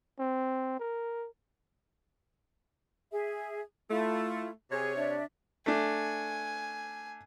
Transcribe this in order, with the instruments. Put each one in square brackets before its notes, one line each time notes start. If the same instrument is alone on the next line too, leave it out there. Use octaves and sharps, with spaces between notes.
[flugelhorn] C4
A#4
[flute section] G#4 E5
[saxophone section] A3 [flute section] E4 F4
[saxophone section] C3 C#5 [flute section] G#4
[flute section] D4 D5 E5
[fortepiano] A3 D4 [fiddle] G#5